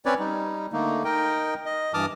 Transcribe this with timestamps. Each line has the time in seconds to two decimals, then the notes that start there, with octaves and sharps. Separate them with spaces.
0.06 C4 C#4 B4 C#5 D5
0.19 G3 D#4
0.73 D3 A3 A#3 D#4
1.04 D#4 A#4 D#5 G5
1.66 D#5
1.94 G2 E3 A5 D6 D#6 F6